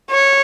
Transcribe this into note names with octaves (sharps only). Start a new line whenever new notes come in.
C#5